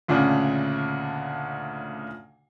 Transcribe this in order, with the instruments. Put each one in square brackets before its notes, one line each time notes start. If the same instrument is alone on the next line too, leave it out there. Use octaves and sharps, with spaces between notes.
[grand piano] D2 A#2 C#3 D4